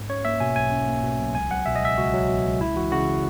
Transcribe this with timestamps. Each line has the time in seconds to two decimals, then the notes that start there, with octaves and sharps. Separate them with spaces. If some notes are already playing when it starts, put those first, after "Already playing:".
Already playing: G#2
0.09 C#4 C#5
0.25 A#3 E5
0.40 B2 G#5
0.56 B1 G#5
0.72 C#4
0.88 A#3
1.03 B2
1.19 B1
1.35 C#2 G#5
1.50 F#3 F#5
1.66 B2 E5
1.76 D#5
1.82 C#2 E5
1.98 C#2 F#4
2.14 F#3
2.28 B2
2.44 C#2
2.60 G#3 E4
2.76 E3 F#4
2.92 C#3 F#4